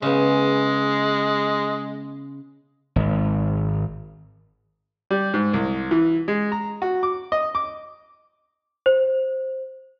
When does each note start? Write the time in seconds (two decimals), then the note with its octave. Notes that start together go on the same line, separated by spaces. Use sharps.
0.02 C#3 G#3 B3
2.96 G#1
5.11 G3
5.34 G#2
5.53 C2
5.91 E3
6.28 G#3
6.52 A#5
6.82 F#4
7.03 D6
7.32 D#5
7.55 D6
8.86 C5